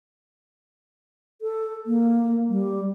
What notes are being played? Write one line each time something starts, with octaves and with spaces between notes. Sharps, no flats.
A4
A#3
G3